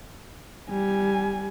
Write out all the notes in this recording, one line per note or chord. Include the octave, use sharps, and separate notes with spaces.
G3 G#5